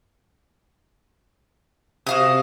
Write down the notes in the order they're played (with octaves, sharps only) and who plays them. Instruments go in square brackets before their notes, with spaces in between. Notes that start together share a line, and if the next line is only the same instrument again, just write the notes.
[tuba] C3 [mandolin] F#4 F5 D#6